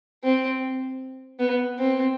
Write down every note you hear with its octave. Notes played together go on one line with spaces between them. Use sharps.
C4
B3
C4